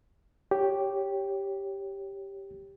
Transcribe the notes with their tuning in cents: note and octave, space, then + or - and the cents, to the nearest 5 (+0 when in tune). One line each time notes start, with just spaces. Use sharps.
G4 +0 C#5 +0